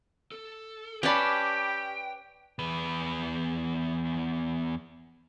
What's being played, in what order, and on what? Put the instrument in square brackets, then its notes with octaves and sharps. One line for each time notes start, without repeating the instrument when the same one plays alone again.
[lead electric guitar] A4
[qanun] C#4 A5 [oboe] G4 [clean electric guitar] B4 D5 B5 [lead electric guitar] G5
[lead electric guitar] E2 B4